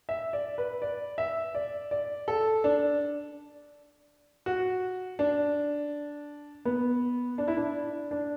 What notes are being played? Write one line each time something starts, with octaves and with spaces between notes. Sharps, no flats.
E5
D5
B4
D5
E5
D5
D5
A4
D4
F#4
D4
B3
D4
E4
D4
D4